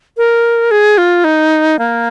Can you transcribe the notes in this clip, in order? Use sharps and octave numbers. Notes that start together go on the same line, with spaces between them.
A#4
G#4
F4
D#4
A#3